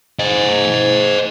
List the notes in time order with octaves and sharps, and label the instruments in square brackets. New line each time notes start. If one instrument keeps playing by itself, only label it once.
[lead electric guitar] C5 D#5